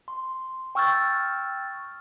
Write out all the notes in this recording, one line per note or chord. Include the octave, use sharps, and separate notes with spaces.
C6
G5 C#6 E6 F6 G6 A6